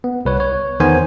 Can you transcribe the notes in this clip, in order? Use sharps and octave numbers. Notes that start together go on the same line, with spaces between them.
B3
C2 B4 C#5
C#5
E2 D#3 B3 C5 G#5